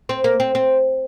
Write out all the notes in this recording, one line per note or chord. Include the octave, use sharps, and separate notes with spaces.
C4
A#3
C4
C4